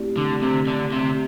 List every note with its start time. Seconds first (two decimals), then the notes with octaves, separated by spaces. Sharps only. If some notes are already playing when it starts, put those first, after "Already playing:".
Already playing: A3 C4 E4 G4 D5
0.17 D3
0.43 C3
0.67 D3
0.92 C3